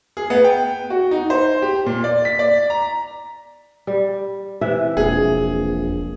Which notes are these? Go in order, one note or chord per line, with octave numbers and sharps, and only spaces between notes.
G#4
B3
G5
F#4
D#4
C5
G4
A#2
D5
B6
D5
A#5
G3
C3 E3 E5
E1 A#1 G#4